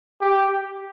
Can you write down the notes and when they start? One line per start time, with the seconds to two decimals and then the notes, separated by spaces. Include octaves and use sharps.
0.21 G4